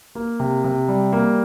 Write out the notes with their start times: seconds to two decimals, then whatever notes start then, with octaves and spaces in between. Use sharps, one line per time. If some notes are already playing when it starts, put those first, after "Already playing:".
0.15 A#3
0.40 C3
0.64 C3
0.88 G3
1.13 A#3